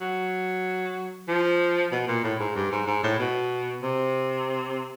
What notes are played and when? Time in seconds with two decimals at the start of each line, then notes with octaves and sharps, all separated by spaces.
0.01 F#3
1.28 F3
1.92 B2
2.08 A#2
2.24 A2
2.39 G#2
2.56 G2
2.71 G#2
2.87 G#2
3.03 A2
3.19 B2
3.83 C3